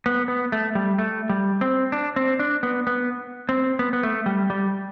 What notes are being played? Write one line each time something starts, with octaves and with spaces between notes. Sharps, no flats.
B3
B3
A3
G3
A3
G3
C4
D4
C4
D4
B3
B3
C4
B3
B3
A3
G3
G3